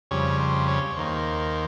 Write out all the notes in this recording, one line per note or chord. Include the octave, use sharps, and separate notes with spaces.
F2 C#3 G3 C#5
C5
C#5
D#2 D#3 A#3 C5